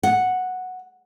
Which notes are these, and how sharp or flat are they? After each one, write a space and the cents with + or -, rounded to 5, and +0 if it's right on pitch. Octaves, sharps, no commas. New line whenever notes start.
F#5 -5